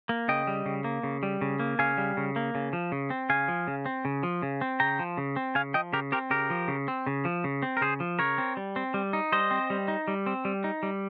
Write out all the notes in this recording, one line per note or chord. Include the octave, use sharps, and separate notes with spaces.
A#3
C#3 D#5 G5
G3
C#3
A#3
C#3
G3
C#3
A#3
C#3 F5 G#5
G3
C#3
A#3
C#3
F3
C#3
C4
C#3 F5 G#5
F3
C#3
C4
C#3
F3
C#3
C4
C#3 G5 A#5
F3
C#3
C4
C#3 F5 G#5
F3 D#5 G5
C#3 G4 A#4
C4 G4 A#4
C#3 G4 A#4
F3
C#3
C4
C#3
F3
C#3
C4
A#4
C#3 G#4 C5
F3
C#3 A#4 C#5
C4
G3
C4
G3
D#4
G3 C5 D#5
C4
G3
D#4
G3
C4
G3
D#4
G3